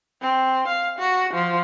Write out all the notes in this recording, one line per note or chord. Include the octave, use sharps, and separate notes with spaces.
C4
F5
F#4
F3